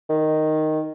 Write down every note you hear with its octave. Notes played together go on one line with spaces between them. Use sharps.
D#3